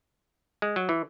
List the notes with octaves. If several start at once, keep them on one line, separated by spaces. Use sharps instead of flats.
G#3
F#3
E3